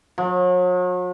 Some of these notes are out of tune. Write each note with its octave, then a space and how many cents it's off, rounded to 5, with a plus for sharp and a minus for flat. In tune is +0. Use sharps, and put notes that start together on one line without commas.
F#3 -40